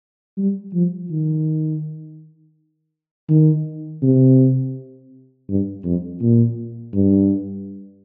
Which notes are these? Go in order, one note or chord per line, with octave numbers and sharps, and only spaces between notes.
G3
F3
D#3
D#3
C3
G2
F2
A#2
G2